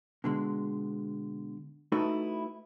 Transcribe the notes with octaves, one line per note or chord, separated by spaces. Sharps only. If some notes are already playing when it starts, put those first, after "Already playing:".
B2 D3 G#3
A3 D#4 E4 F#4 A4 B4